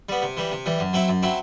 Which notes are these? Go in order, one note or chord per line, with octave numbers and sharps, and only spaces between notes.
G3 B3
C3
E3 G3
C3
E3 G3
F#2
F#3 C4 E4
F#2
F#3 C4 E4